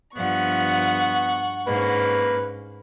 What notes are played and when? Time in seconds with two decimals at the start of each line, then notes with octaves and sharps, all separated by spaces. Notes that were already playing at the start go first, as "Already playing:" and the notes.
0.16 G2 F3 B3 F#5 C#6
1.67 G#2 A#3 C#4 B4